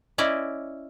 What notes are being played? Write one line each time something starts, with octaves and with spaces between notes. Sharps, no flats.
C#4 E4 D5 D#5